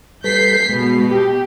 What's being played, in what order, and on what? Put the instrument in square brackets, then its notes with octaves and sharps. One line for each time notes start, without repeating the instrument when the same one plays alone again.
[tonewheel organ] G3 A4 B4 [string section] G6 B6 C7
[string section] B2 [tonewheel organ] G#3
[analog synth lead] G4 [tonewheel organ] G5